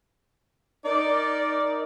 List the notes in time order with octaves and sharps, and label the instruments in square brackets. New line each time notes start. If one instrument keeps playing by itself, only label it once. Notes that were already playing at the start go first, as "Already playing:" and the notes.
[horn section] D#4 A#4 D5